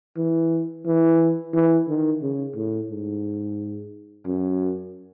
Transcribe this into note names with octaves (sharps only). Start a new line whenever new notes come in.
E3
E3
E3
D#3
C#3
A2
G#2
F#2